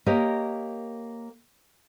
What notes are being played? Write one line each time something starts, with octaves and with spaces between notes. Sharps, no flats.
A#3 G4 A#4 C#5 D#5